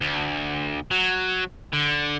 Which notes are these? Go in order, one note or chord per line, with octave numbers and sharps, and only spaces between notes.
D2
F#3
D3